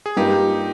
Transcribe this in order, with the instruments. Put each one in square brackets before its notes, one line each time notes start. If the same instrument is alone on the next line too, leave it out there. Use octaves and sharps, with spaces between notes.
[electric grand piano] G#4
[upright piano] G2 G3 A#3 F4 [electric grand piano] D#4 G4